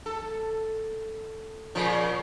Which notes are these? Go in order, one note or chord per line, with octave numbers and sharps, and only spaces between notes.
A4
A#2 C#3 F3